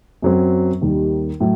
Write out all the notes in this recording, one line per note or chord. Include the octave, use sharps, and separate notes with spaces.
F#2 F#3 C4
D#2 D#3 G3
A2 F#3